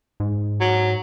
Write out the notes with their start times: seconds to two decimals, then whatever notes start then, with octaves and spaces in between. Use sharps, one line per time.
0.20 G#2
0.61 F#3